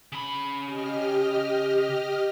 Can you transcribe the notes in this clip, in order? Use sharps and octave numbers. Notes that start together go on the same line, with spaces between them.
C#3 B5
G4 D#5 F6